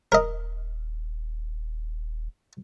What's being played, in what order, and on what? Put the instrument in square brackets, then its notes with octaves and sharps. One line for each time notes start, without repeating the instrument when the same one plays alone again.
[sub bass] D#1 [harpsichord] A#4 D#5